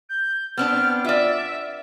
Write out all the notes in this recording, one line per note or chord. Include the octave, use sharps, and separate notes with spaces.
G6
B3 C4 D4 F6
F4 D5 E5